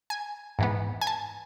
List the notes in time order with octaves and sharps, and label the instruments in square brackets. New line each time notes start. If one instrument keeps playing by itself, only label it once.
[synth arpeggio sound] G#5
G#2 E3 B3
G#5
A5